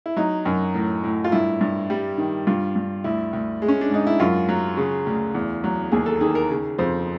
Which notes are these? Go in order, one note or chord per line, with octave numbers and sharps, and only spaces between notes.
E4
F#3 D#4
F#2
A2
A2
F4
G2 E4
G2
G3
D#3
G2 F4
G2
D2 E4
D2
G#3
C#4
D4
G#2 D#4
E4
F#2 F4
F#3
C#3
D2
E2
F#3
D#2 G#4
A4
D#3 G#4
A#4
C#3
F2 C5